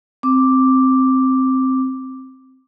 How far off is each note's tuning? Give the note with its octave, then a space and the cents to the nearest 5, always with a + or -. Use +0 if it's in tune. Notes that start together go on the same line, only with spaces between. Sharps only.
C4 +0 D6 +0